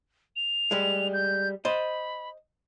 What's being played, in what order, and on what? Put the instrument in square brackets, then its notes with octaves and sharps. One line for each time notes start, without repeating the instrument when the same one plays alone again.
[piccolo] F7
[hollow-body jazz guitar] G3 G#3
[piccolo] G6
[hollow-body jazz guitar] C5 D#5 [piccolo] B5